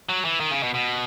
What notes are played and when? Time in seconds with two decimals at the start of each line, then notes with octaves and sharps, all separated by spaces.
0.09 F#3
0.25 E3
0.40 D#3
0.51 C#3
0.63 B2
0.74 B2